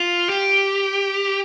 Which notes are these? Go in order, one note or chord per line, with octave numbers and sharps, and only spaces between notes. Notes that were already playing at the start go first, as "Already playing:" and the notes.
Already playing: F4
G4